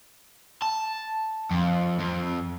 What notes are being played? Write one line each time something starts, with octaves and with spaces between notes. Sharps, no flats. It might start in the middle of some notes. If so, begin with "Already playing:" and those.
A5
F2
F2